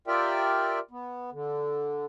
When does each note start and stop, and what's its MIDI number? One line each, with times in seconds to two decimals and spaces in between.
0.07 0.79 65
0.07 0.79 67
0.07 0.79 70
0.07 0.79 74
0.07 0.79 76
0.07 0.79 79
0.91 1.30 59
1.32 2.05 50